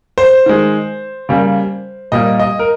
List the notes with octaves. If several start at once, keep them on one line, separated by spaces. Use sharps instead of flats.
C5
D#3 G#3
C#3 G3 A#3
A#2 G3 A#3 D#5
D#5
A#4